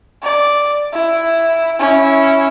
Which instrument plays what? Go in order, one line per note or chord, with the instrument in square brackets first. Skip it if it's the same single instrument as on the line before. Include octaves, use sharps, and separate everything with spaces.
[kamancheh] D5
E4
C#4 E4